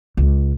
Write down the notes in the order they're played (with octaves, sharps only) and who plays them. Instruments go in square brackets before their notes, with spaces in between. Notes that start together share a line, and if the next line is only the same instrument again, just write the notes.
[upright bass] C#2